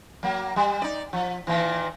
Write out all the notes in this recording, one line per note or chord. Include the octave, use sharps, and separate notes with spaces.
F#3 A#3
G3
D#4 D5
F3
A#2 D#3 E3